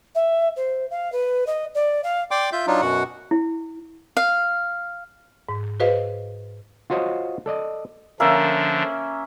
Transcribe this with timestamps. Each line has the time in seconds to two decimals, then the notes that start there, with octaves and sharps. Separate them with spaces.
0.15 E5
0.56 C5
0.90 F5
1.12 B4
1.47 D#5
1.75 D5
2.03 F5
2.31 D5 G5 C6 D6
2.52 F4 E5 G6
2.67 F#3 D4 D#4 F4
2.81 F#2 B2 F#4 F#5
3.31 E4
4.17 F5
5.49 G#2
5.80 F#4 G#4 B4 C5 D#5 F5
6.90 F4 F#4 C5 C#5 D#5
7.46 A4 D5 D#5
8.20 D3 F3 A#3 C#4 D4 E5